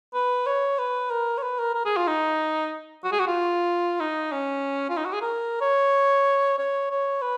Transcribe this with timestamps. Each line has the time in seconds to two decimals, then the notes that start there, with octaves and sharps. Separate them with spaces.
0.14 B4
0.46 C#5
0.78 B4
1.11 A#4
1.38 C#5
1.42 B4
1.59 A#4
1.75 A#4
1.85 G#4
1.97 F4
2.08 D#4
3.04 F#4
3.12 G#4
3.20 F#4
3.27 F4
4.00 D#4
4.32 C#4
4.90 F4
4.97 D#4
5.06 F#4
5.13 G#4
5.22 A#4
5.61 C#5
6.58 C#5
6.90 C#5
7.22 B4